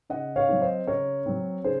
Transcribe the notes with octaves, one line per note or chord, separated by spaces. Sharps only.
C#3 D#5 F#5
C#5 F5
F#3 C4
C5 D#5
C#3 A#4 C#5
F#3 C4
C#3 G#4 C5